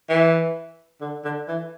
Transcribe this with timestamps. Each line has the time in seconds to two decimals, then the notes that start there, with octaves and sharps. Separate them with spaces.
0.09 E3
1.01 D3
1.25 D3
1.48 E3